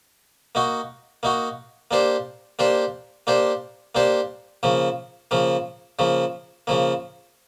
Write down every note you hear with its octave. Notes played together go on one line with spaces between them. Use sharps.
A#3 D#4 F#4
A#3 D#4 F#4
A#3 D4 G4 C5
A#3 D4 G4 C5
A#3 D4 G4 C5
A#3 D4 G4 C5
C#3 F3 A#3
C#3 F3 A#3
C#3 F3 A#3
C#3 F3 A#3